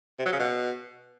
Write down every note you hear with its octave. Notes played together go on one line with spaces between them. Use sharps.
C3
F#3
C#3
B2